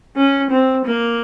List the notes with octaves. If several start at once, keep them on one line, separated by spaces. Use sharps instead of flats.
C#4
C4
A#3